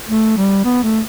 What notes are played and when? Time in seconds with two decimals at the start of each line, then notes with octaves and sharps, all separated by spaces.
0.09 A3
0.37 G3
0.64 B3
0.83 A3